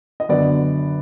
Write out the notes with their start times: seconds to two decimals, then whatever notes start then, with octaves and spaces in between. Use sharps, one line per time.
0.20 D#5
0.29 F#2 D3 F#3 B3 D5